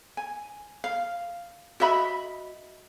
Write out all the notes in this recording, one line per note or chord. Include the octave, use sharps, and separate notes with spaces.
G#5
F5
F#4 D#5 E5 B5